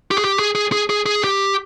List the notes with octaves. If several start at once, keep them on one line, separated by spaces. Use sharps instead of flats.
G4
G#4
G4
G#4
G#4
G#4
G#4
G#4
G4